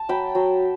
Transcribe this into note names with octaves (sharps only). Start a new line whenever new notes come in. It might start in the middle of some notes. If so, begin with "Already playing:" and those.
Already playing: A5
F#3 G5 B5
F#3